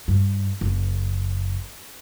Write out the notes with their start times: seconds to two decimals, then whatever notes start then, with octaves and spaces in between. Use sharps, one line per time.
0.08 G2
0.61 F#1